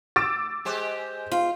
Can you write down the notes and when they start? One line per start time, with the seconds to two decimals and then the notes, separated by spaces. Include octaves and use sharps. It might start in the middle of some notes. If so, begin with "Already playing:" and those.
0.16 D6 E6 A6
0.65 G#3 G4 C5
1.32 F4